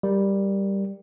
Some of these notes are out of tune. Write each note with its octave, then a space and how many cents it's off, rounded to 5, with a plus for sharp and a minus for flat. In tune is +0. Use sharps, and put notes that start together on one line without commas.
G3 +5 A#4 +0